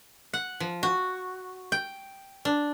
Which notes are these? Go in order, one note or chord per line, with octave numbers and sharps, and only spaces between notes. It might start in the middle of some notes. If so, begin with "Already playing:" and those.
F#5
F3
F#4
G5
D4